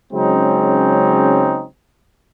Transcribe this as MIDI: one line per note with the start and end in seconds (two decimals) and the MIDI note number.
0.13 1.65 49
0.13 1.65 54
0.13 1.65 56
0.13 1.65 60
0.13 1.65 61
0.13 1.65 63